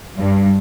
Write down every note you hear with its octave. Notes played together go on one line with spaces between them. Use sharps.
G2